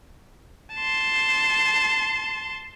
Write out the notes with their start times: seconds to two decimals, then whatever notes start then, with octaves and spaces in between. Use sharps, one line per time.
0.76 A5 C6